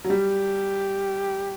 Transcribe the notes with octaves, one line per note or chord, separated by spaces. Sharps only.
F#3
G3 G4